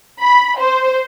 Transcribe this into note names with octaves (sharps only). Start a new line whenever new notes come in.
B5
C5